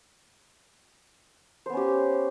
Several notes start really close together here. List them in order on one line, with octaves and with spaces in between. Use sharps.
C5 B3 C#4 G4